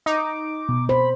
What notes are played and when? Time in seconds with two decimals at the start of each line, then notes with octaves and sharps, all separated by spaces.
0.06 D#4 D6
0.69 B2
0.89 C5 B5